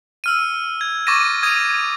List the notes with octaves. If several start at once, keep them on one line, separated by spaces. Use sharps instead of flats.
E6 F6 D#7
G#6
C#6 D6 A6 A#6 D#7
D#6 G#6 D#7